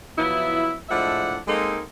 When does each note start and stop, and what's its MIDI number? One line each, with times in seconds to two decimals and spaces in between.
0.17 0.72 53
0.17 0.72 54
0.17 0.72 59
0.17 0.72 64
0.89 1.38 45
0.89 1.38 53
0.89 1.38 56
0.89 1.38 62
0.89 1.38 76
0.89 1.38 78
1.47 1.81 56
1.47 1.81 58
1.47 1.81 60
1.47 1.81 63
1.47 1.81 69